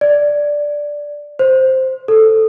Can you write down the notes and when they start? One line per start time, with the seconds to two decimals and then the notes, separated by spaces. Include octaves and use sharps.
0.01 D5
1.39 C5
2.08 A4